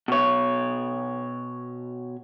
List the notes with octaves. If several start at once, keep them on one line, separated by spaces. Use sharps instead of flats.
B2 C#5